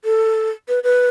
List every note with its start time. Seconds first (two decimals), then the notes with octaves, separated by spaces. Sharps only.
0.05 A4
0.69 B4
0.84 B4